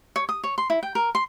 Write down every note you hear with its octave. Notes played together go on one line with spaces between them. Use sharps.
C#5
D#6
C#5
C6
E4
G5
A#4
C6